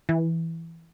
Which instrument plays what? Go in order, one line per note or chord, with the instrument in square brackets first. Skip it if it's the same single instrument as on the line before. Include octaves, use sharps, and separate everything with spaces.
[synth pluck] E3